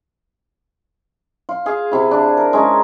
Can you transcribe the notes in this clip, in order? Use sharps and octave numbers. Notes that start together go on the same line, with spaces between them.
F4
G#4 F5
C3 E4
D4
A#4
G#3 C#4 C5 A#5